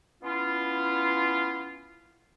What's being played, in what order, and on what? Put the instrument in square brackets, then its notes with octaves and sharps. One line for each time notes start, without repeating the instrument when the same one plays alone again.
[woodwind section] B3 C#4 E4 F4